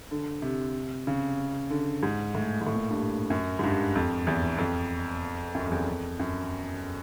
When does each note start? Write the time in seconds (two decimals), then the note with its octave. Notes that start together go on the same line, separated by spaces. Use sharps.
0.11 D3
0.42 C3
1.07 C#3
1.70 D3
2.03 G#2
2.35 A2
2.61 G#2
2.67 A2
2.75 A#2
2.90 G2
3.30 F#2
3.59 G#2
3.63 G2
3.95 F2
4.27 E2
4.58 F2
5.55 F#2
5.66 F2
5.72 E2
5.87 F2
6.20 F#2